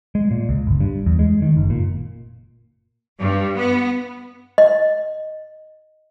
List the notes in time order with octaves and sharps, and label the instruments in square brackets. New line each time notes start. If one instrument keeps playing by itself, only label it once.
[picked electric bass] G#3
A#2
C#2
G1
G2
E2
G#3
D#3
F#1
A#2
[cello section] G2
B3
[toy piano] D#5